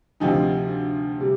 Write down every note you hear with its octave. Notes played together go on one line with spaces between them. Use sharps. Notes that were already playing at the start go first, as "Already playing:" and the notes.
D2 C3 F3 C4 D#4
C3 G3